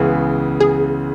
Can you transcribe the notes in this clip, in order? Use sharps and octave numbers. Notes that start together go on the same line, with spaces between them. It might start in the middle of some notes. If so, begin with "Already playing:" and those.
Already playing: C#2 C#3 E3 B3 G#4
G#4